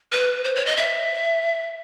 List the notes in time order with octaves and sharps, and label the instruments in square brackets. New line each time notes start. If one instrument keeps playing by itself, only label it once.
[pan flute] B4
C5
C#5
D#5
E5